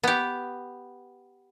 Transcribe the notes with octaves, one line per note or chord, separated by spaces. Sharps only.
B3 G4